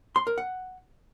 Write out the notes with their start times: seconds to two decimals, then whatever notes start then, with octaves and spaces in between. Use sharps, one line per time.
0.16 C6
0.27 A#4
0.38 F#5